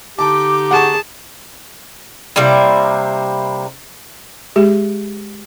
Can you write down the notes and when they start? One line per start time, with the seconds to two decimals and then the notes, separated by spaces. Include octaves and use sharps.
0.19 D3 D#4 G4 A5 D6
0.71 G#4 F#5 A5 C#6
2.36 C3 G3 A#3 E4
4.56 G#3 G4 G#4